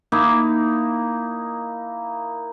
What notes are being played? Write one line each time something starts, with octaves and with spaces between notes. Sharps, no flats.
A#3 D#4 E4